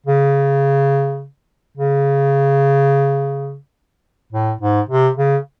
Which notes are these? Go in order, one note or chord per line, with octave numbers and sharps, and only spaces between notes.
C#3
C#3
A2
G#2
C3
C#3